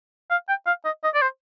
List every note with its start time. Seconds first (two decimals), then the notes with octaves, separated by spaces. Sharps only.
0.31 F5
0.49 G5
0.67 F5
0.85 D#5
1.04 D#5
1.14 D5
1.22 C5